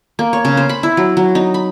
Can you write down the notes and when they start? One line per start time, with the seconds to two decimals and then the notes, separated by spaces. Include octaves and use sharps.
0.19 A#3
0.33 C#5
0.45 C#3
0.57 C5
0.69 B5
0.83 E4
0.97 F#3
1.17 F#3
1.35 D#4
1.54 B5